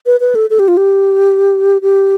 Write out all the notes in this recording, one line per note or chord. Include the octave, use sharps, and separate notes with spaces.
B4
B4
A4
A4
G4
F4
G4
G4